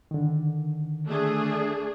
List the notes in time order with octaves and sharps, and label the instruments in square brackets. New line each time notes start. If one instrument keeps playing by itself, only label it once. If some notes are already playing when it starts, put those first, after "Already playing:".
[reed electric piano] D3 D#3
[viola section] A3 D4 G#4